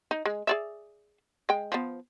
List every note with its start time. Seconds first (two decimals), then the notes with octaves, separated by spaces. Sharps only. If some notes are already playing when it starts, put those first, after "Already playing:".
0.11 D#4
0.25 G#3
0.47 G#4 D5 E5
1.49 G#3 G5
1.72 F3 B3